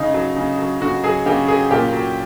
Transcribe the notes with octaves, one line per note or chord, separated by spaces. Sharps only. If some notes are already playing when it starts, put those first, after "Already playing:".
Already playing: C#3 D#4
F#3
C#3
F#3
C#3 F#4
F#3 G#4
C#3 G4
F#3 G#4
A#2 G4
F#3